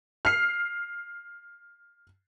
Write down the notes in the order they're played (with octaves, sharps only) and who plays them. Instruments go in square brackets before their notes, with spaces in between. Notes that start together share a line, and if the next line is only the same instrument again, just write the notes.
[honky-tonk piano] F6 C7